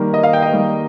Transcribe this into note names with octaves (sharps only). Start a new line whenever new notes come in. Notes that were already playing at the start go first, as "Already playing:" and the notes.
Already playing: D#3 G3 A#3
D#5
F5
G5
D#5
D#3 G3 A#3